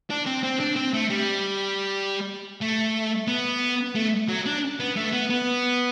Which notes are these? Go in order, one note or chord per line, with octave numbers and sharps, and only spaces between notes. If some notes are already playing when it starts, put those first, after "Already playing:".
D4
C4
C4
D4
C4
A3
G3
A3
B3
A3
F#3
D4
B3
A3
B3
B3